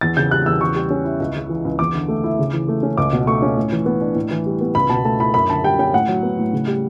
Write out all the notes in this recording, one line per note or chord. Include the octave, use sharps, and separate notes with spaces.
E2 A6
C#3 G6
G3 F#6
E2 E6
C#3 C#6
G3
C#4
E4
C#2
C#3
E3
C#2
E2 D6
D3
A3
E4
C#3
E3
A3
C#4
C#2 D6
B2
A3 C#6
C#4
A2
E3
B3
D4
A2
E3
G3
B3
C#2 B5
B2 A5
A3 A5
E4 B5
F#2 B5
D3 A5
G3 G5
C#4 G5
A2 F#5
F#3
B3
A2
C#3
G3